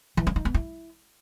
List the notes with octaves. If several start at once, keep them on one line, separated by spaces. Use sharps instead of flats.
E3
C#4
D#4
B3
E4